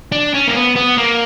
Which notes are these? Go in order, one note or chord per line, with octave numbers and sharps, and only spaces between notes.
D4
C#4
A#3
B3
B3
A#3